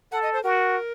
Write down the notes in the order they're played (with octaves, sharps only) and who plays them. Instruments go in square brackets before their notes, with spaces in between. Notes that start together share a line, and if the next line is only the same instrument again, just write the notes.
[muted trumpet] A4 [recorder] F#5
[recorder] D#5
C5
[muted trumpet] F#4 [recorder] A#4